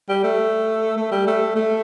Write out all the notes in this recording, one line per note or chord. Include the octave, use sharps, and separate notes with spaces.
G3
A3
A3
G3
A3
A3